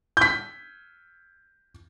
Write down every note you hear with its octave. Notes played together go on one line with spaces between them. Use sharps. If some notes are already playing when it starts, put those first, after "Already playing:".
G6 B6